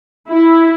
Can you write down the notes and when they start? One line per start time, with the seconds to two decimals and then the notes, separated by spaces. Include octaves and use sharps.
0.30 E4